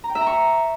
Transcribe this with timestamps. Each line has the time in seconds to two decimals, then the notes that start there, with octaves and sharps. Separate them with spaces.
0.04 A#5
0.09 G5
0.15 E5
0.21 A#5
0.27 C#6